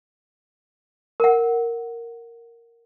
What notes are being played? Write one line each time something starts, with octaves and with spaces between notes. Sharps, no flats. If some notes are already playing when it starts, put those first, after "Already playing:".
A#4 F#5